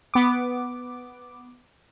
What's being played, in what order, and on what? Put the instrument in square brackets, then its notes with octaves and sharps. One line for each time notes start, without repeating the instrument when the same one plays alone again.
[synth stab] B3 D6